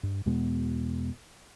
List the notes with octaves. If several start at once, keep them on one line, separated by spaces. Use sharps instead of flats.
G2
E2 B2 G#3 B3